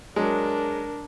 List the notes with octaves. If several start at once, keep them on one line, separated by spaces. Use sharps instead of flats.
F#3 G#3 D4 A#4